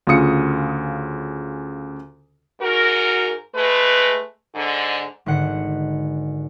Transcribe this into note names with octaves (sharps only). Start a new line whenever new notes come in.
D2 C#3 F4 D#6 C#7
G#2 F#4 A#4
G#3 A3 B4
G#2 D3
G#1 D3 C5 F#5 C#7